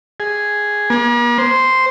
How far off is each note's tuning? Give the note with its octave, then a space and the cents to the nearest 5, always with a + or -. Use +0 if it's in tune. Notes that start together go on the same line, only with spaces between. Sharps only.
G#4 +0
A#3 +45
C5 -5